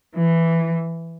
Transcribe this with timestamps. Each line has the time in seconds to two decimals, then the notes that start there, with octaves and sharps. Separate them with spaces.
0.16 E3